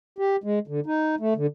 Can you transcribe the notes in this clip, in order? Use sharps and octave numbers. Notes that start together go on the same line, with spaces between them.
G4
G#3
D3
D#4
A3
D3